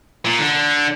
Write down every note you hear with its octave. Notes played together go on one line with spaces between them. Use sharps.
A#2
D3